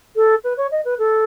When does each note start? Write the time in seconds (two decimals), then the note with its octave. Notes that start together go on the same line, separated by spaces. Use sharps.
0.16 A4
0.44 B4
0.57 C#5
0.71 D#5
0.85 B4
0.99 A4